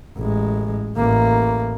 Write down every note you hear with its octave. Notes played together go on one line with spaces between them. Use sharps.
A1 G#3
A1 A#3